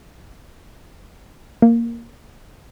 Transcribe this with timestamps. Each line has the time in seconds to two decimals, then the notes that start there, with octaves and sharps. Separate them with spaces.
1.62 A#3